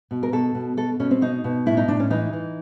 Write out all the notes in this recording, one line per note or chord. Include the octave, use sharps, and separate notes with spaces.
B2
A#4
B2 A4
B2
B2 A4
B2 C#4
C4
B2 D#4
B2
A2 E4
D#4
A2 D4
C#4
E3 D#4
E3